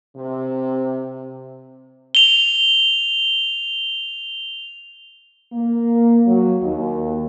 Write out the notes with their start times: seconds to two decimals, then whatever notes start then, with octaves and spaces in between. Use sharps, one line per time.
0.16 C3
2.15 F7 G7
5.53 A#3
6.27 F#3
6.62 D#2